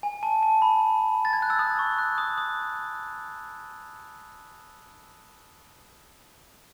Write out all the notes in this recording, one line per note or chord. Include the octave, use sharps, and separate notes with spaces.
G#5
A5
A5
B5
A6
G#6
F#6
E6
D#6
C#6
F#6
D#6
D#6